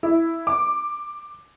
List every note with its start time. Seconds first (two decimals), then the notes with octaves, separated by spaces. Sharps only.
0.03 E4
0.47 D6